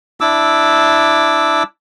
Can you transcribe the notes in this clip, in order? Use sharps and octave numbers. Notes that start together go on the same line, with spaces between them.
D4 E4 D6 E6